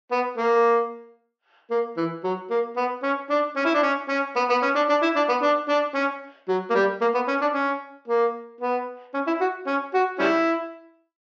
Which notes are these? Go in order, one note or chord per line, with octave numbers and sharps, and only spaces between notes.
B3
A#3
A#3
E3
F#3
A#3
B3
C#4
D4
C#4
E4
D4
C#4
C#4
B3
B3
C#4
D4
D4
E4
D4
B3
D4
D4
C#4
F#3
A#3
G3
A#3
B3
C#4
D4
C#4
A#3
B3
C#4
E4
F#4
C#4
F#4
G3 C#4 E4